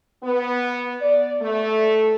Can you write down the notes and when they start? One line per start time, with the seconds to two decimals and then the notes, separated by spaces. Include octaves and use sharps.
0.23 B3
1.01 D5
1.42 A3